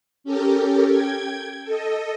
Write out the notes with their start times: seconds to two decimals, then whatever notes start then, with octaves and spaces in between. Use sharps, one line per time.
0.24 C#4 G4 A4 A#4
0.88 G5 G#6
1.64 A4 D#5